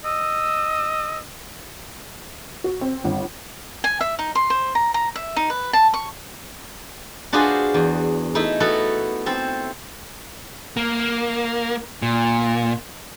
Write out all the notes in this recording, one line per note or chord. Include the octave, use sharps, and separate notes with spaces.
D#5 E6
F#4
C4
G1
G#5
E5
D#4
C6
C5
A#5
A#5
E5
D#4
B4
A5
C#6
D4 F4 F#4 G#4 B4 C5
E2
A3 D#4 E4
B3 F#4 A4
C4 A4 C5
A#3
A#2